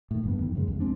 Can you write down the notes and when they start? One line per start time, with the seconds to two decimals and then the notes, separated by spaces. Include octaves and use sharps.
0.11 A2 D#3
0.24 F#1 G2 B3
0.39 F2 D#3
0.55 F#2 C#3 G#3
0.67 C2 F2
0.80 G#3 C4 D4